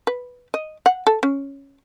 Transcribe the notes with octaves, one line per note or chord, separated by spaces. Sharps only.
B4
D#5
F#5
A4
C#4